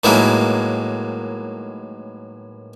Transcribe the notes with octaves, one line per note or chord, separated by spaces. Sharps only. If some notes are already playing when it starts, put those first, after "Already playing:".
A2 D#3 E3 F#3 G#3 A#3